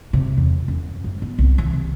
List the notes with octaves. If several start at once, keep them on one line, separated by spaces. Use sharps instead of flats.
C3
E2
F#2
G#2
B3
C2
E3
C3